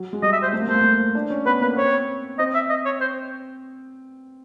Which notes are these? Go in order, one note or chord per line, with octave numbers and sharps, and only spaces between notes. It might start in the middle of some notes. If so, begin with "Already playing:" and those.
Already playing: F#3
G#3
G3 D#5
E5
C5
A3
A#3
A3 C5
A#3
A3
D4
C#4
B3 B4
A#3 B4
B3
C4 C#5
C4 D#5
E5
D#5
C#5
C5